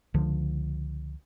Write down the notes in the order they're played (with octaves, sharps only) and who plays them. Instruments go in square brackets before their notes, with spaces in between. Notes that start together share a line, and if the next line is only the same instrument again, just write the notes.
[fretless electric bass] C#2 D3 F3